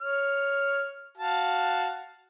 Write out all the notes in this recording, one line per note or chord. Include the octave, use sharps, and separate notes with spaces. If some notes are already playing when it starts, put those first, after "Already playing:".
C#5 F6
F#4 F5 A5